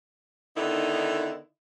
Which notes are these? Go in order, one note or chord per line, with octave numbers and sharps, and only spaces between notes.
D3 D#3 B3 D#4 E4